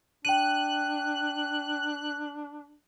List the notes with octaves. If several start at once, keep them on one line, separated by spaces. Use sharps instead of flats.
D4 G5 F#6 D#7